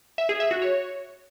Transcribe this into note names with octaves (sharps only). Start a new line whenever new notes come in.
E5
G#4
E5
F#4
C#5